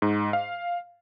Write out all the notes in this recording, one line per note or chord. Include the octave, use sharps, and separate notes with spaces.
G#2
F5